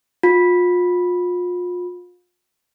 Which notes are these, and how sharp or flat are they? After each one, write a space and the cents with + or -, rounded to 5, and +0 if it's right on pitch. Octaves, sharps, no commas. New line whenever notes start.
F4 +35